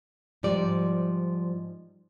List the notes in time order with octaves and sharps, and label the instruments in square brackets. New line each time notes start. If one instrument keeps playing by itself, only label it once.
[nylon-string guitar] G#2 F3 G3 D5